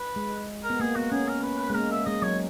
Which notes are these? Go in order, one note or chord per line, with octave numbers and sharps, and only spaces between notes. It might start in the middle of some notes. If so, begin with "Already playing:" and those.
Already playing: B4
G#3
A#4
B3
A#3 G#4
B3 F#4
C#4 G#4
A#4
B4
B4
G#3 B4
A#3 A#4
E5
G#3 D#5
F#3 C#5